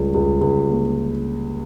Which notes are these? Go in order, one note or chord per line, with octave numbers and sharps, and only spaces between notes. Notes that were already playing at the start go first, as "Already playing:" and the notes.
Already playing: C#2 G3
C#2
C#2
A#3